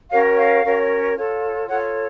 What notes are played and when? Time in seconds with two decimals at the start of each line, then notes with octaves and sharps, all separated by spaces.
0.11 C#4 F#4 A#4 C#5 F5
0.38 F5
0.64 C#4 F#4 A#4 C#5
1.15 F4 A4 C#5
1.68 F4 A4 C#5 F#5